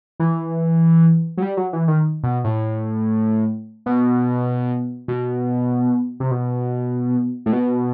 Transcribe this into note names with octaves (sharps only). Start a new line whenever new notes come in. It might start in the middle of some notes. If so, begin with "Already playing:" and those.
E3
F#3
G3
F#3
E3
D#3
B2
A2
B2
B2
C3
B2
A2
B2